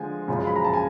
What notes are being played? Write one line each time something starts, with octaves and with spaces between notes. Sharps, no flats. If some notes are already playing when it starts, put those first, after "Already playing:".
Already playing: D3 F3 G#3 G#5
F#2 C#3 F3 G#3
B5
A#5
A5
G#5